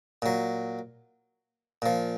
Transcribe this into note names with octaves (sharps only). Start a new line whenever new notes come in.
A#2 F#3
A#2 F3